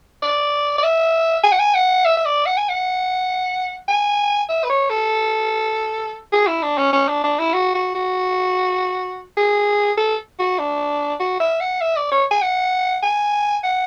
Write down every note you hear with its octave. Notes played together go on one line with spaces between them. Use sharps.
D5
D5
E5
G#5
F#5
G#5
F#5
E5
E5
D5
F#5
G#5
F#5
G#5
E5
B4
C#5
A4
G#4
E4
D4
C#4
C#4
D4
D4
E4
F#4
F#4
F#4
G#4
A4
F#4
D4
F#4
E5
F#5
E5
D5
C#5
G#5
F#5
G#5
F#5